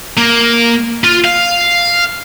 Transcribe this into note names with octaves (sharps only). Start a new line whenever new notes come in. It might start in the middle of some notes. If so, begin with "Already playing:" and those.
A#3
F4
F5